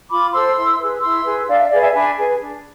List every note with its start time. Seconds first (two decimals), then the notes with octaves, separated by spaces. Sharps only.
0.10 F4 B5 D6
0.33 A4 C5 C6 E6
0.55 E4
0.79 G#4 B4
1.01 E4 C6 E6
1.24 G#4 B4
1.47 D4 D5 F5
1.59 E5
1.70 G#4 B4 D5 F5
1.81 E5 G#5
1.93 D4 G#5 B5
2.16 G#4 B4
2.39 D4